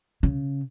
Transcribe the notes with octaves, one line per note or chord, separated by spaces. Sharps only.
C#3